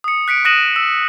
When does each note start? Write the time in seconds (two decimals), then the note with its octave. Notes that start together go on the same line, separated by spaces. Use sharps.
0.04 D#6 C#7
0.28 F#6 B6 C#7 D7
0.45 D#6 F#6 A#6 D#7 E7 F#7
0.76 E6